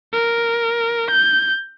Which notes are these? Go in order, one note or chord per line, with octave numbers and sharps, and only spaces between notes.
A#4
G6